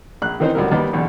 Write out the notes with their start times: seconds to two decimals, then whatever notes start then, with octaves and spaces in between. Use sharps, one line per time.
0.22 A#1 F#6
0.40 D#3 E3 C4 D#4 A#4 C5
0.55 C#2 D3 F#3 G3 A#4
0.71 D#2 G3 B3 D#4
0.93 B1 E2 D3